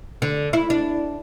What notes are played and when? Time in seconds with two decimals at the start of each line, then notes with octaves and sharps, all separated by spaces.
0.22 D3
0.53 E4
0.70 D4